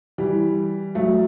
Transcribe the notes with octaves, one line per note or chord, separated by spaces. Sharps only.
E3 G3
F#3 A3